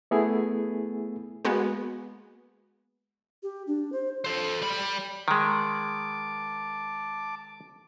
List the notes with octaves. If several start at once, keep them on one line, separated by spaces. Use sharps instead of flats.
A3 B3 E4 G#4 G#5
G#3 A#3 B3 F#4 G#4
G4
D4
C5
A4 C5
G3 B5
D#3 G#3 A5 D6